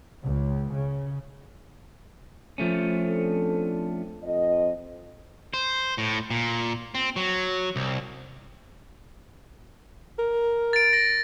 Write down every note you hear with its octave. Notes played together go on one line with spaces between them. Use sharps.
C#2
C#3
F3 A3 C#4
C4 D4 A4
F2 D#5
C5
A2
A#2
C4
F#3
C2
A#4
A6 D7
A#6